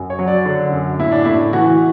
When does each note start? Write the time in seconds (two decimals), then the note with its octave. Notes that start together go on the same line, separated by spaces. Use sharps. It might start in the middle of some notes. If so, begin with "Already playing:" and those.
Already playing: F#2
0.10 C#5
0.19 F#3
0.28 D5
0.45 D3
0.73 F#2
0.99 A2 E4
1.12 D4
1.25 A2 E4
1.53 E3 F#4